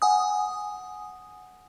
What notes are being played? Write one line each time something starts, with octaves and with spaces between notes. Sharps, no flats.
F#5 G#5 D#6